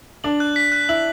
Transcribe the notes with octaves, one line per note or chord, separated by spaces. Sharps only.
D4 F#7
F#6
B6
F#6
E4 F#7